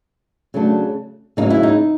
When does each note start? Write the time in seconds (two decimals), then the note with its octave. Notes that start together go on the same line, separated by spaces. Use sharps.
0.54 C#3 F#3 A3 D4
1.37 C#3 F#3 A#3 C#4 D#4
1.50 E4
1.63 D#4